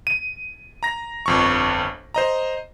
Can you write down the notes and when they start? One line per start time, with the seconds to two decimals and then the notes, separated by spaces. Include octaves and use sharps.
0.07 D#7
0.83 A#5 A#6
1.26 G1 F2 C#6
2.14 C5 D#5 A#5